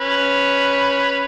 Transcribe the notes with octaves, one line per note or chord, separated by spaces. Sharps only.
C#4 B4